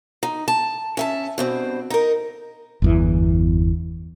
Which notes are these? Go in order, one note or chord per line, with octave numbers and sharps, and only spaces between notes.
D#4
A5
C#4 E5 A5
G2 B2 C4
D#4 A#4
G1 E2 E3